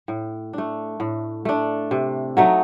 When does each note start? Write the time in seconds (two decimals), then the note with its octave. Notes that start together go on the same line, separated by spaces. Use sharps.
0.08 A2
0.53 A3 D4
1.00 A2
1.45 A3 D4
1.91 C3
2.37 F#3 A3 D#4